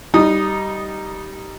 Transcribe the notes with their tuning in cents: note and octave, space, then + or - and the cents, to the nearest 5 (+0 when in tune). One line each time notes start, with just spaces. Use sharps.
G3 -10 D#4 +0 D#6 -10